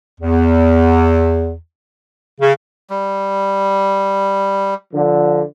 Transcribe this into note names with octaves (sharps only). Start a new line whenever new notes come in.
E2
C#3
G3
D3 F3